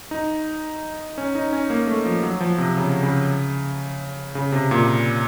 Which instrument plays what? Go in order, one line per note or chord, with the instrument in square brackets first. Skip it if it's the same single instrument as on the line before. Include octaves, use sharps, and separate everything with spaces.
[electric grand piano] D#4
C#4
D#4
C#4
A#3
A3
F3
F#3
F3
C3
C#3
C#3
C#3
C3
A#2